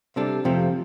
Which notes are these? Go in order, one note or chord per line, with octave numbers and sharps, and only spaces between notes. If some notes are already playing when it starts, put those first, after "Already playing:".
C3 G3 D4 A4
F2 C3 F3 A3 C4